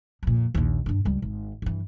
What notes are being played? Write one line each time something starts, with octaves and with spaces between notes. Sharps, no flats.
F2 A#2
A#1 D#2
G2 D4
C#2 G3
G#1
G2 E3